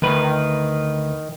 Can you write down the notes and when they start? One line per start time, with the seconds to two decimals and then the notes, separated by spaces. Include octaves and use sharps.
0.02 D2 D#3 B4